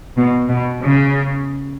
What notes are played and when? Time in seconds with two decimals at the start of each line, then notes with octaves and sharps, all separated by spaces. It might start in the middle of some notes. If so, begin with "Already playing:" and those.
0.17 B2
0.49 B2
0.81 C#3